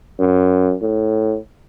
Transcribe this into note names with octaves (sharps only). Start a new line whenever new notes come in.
F#2
A2